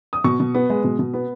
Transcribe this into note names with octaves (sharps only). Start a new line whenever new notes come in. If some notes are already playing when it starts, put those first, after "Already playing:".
D#6
B2 C#6
B2
B3
G#3
B2
B2
B3